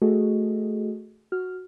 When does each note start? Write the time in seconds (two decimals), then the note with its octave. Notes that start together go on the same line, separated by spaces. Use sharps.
0.02 A3 F#4 G#4 A4 D#5
1.32 F#4 F6